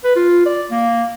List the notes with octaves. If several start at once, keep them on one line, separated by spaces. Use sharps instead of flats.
B4
F4
D5
A#3